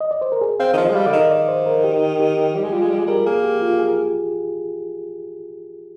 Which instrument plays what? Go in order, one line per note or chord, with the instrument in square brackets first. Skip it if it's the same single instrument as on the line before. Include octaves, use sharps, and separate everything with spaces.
[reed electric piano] D#5
D5
C5
A#4
G#4
[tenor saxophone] C4 [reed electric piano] F5
[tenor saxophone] D#3
[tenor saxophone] F3 [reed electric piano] D#5
[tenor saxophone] G#3
[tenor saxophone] G3 [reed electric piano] F5
[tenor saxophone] D3
[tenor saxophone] D#3 [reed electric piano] D#5
[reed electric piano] D5
C5
A#4
G4
G4
[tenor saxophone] G3
G#3
[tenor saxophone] G3 [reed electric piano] F4
[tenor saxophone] G#3
[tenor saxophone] G3 [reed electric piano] G#4
[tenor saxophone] G#3
[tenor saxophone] G3 [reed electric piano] A#4
[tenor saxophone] A#3 [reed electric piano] G#4
[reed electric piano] G4
F4
G#4